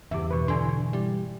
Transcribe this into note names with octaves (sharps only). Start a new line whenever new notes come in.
E2 G2 C#3 G4 E5 D6
G2 B2 E3 B4 C#6
D3 E4 G#5 C6
G3 E4